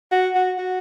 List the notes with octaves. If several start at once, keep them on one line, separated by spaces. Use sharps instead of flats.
F#4
F#4
F#4